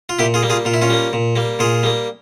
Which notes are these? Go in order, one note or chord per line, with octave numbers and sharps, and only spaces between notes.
F4
A#2 E4 G4
F4 G#4
G3 A#3
F4 G#4
A#2 F4
E4
C#4 F4
G3 A#3
A#2
G3 A#3
A#2 F4 G#4
G3 A#3